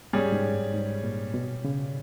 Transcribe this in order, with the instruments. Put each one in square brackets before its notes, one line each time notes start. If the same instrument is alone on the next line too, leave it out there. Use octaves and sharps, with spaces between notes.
[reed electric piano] G#2 [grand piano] G3 C#4 G#4
[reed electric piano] G#2
G2
G#2
A#2
B2
C#3